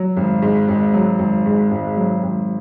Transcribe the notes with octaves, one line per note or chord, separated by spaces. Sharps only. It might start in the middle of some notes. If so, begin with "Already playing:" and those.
Already playing: F#3
G#1
G#2
G#1
F#3
G#1
G#2
G#1
F#3
G#1